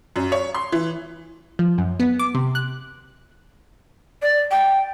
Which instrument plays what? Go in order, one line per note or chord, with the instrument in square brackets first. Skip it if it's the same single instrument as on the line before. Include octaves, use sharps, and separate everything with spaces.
[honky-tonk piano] F#2
C#5
C6
E3
[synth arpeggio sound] F3
F#2
B3
D6
C3
F#6
[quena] D5
G5